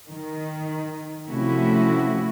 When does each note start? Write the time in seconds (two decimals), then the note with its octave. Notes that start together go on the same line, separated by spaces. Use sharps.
0.10 D#3
1.28 C3 F3 A3 C#4 E4 F#4